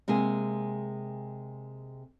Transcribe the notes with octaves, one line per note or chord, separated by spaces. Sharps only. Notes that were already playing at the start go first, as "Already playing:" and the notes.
C3 G#3 A#3 G#4